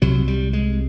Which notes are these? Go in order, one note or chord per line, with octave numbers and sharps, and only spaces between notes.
C2 C3 F#3
G3
G#3